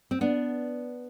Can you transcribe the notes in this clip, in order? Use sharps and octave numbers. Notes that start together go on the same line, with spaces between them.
C4
B3 D4